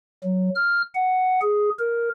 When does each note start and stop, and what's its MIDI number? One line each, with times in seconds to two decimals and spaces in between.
0.24 0.50 54
0.55 0.82 89
0.95 1.40 78
1.42 1.70 68
1.79 2.09 70